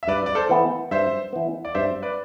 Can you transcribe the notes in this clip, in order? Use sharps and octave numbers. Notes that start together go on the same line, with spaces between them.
E5
G2 B4 D5
D5
A4 C5
E3 B3
G2 C5 E5
E3 B3
D5
G2 C5 E5
B4 D5